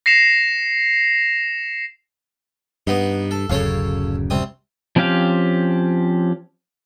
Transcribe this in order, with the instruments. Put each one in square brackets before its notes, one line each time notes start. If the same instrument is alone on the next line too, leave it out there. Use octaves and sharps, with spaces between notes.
[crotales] A#6 C7 C#7 E7 F7
[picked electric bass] G2 [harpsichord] B3 D#4
[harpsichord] A4
[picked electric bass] D1 F#2 C#3 [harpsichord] A4 C#5 F5
[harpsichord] C2 C4 D#6
[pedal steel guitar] F3 C4 C#4 G4 F5